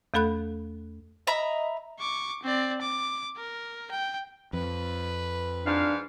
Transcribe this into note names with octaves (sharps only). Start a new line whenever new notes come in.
E2 A3 A4 B5 F#6
D#5 E5 A#5 B5
C#6 D6
C4 D5
D6
A#4
G5
F2 B4
G#2 D4 F5